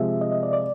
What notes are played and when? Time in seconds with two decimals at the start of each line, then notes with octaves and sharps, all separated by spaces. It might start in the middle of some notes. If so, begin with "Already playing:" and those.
Already playing: C3 F3 G#3 E5
0.21 D#5
0.32 D#5
0.43 D5
0.53 D5